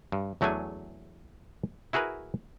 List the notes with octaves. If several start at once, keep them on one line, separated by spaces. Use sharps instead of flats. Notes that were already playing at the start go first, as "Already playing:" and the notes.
G2
E2 F#3 A3 D4 G#4 G#5
E4 F#4 G#4 A#4 B4